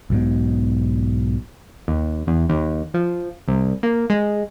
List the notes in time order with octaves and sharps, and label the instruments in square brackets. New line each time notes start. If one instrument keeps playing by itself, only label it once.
[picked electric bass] B1 G#2 B2
[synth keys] D#2
E2
D#2
F3
C2
A#3
G#3